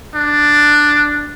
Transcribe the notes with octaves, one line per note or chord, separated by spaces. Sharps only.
D4